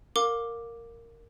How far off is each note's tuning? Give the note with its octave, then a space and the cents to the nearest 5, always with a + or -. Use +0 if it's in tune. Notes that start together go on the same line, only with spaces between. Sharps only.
A#4 -10 F5 +25 D6 +0